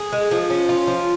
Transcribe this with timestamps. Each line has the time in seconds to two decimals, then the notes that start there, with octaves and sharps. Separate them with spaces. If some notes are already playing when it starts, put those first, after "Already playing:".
Already playing: G#4
0.12 G#3
0.31 F3
0.50 C#4
0.69 F4
0.87 F3